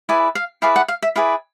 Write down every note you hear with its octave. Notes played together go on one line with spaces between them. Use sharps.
E4 G#4 B4 D5 G#5
F5
E4 G#4 B4 D5 F5
F#5
F5
E5
E4 G#4 B4 D5 F5